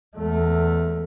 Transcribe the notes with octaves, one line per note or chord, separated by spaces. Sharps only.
E2 A3